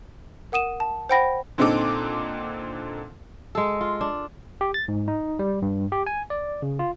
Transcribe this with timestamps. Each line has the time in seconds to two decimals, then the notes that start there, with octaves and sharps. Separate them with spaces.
0.52 A#4 F#5 D#6 D#7 E7
0.80 A5
1.09 C5 F#5 G5 B5 A#6
1.58 A#2 D3 C4 D#4 A4 D6
3.55 G#3 A4
3.81 F4
4.01 D4
4.61 G4
4.74 A6
4.88 G#2
5.08 D#4
5.39 G3
5.62 G2
5.92 G4
6.07 G#5
6.30 D5
6.62 C#3
6.79 F4